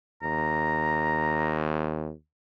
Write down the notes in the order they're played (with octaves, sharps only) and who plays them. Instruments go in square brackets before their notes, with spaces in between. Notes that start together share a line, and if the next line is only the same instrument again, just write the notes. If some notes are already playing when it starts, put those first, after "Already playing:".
[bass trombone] D#2 [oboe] A#5